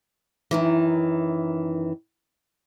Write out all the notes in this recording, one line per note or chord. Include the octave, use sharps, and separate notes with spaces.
F#2 D#3 E3